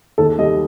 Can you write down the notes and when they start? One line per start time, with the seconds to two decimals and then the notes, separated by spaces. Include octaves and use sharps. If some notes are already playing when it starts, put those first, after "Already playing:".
0.18 D#2 A4
0.39 G3 D#5